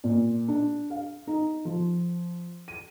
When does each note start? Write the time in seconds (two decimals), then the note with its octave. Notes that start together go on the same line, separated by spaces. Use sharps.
0.04 A#2
0.48 D4
0.90 F5
1.27 D#4
1.65 F3
2.68 D#7